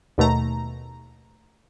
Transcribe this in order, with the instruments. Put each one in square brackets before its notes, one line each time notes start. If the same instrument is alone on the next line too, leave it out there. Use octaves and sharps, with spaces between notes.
[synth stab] D#2 B2 A3 A#5